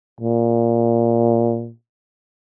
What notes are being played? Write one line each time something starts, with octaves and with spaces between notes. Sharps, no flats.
A#2